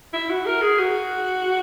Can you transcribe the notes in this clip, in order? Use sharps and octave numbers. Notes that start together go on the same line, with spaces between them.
E4
F#4
A#4
G#4
F#4